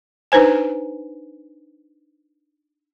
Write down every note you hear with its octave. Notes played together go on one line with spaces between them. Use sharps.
D4 D#4 B4 C5 G#5